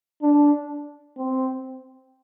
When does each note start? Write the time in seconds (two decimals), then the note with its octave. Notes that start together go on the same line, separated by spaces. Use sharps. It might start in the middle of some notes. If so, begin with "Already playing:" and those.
0.22 D4
1.17 C4